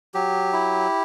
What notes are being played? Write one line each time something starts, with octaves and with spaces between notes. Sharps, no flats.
F#3 G4
E4